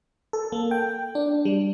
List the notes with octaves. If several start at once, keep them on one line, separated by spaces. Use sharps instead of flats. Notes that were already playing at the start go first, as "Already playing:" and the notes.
A4
A#3
G5
D4
G3